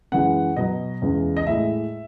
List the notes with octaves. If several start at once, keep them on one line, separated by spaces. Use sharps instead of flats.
F#2 E3 G#3 F#5
B2 F#3 D#5
E2 C#3 G#3
D#5
A2 G#3 E5